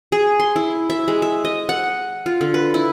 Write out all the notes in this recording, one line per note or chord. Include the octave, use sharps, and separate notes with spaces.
G#4
C6
E4
E5
G#3
E5
D#5
F#5
F4
D3
B4
E4